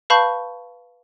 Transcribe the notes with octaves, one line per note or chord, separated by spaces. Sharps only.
B4 F5 A5 B5 C#6 G6